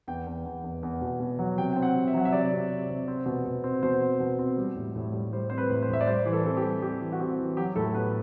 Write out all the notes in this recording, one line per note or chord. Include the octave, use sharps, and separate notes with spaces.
E2 G5
E2
E2
E2
E2
B2
B2
F#3
C3 G5
C4 G5
F#5
C3
E5
F#3 F#5
E5
C3 D5
C3
C4
C3
C4
B2
B2
C4
B2 C5
C4
B2
C4
G3
A2
A2
G3
G3 C5
C4 C5
B4
A2
C5
A2 E5
D5
G3 C5
E3
A4
C4 A4
G4
G3
C4 G4
E3
F#4
C4 G4
E3
F#3 G4
A2 A4
B3 B4